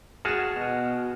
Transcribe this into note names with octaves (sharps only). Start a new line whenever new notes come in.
F#4 G#4 A5 F6 E7
B2